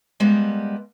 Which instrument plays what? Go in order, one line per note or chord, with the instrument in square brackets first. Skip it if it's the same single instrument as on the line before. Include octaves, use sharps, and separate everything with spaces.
[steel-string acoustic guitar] G3 G#3 A#3 B3 G4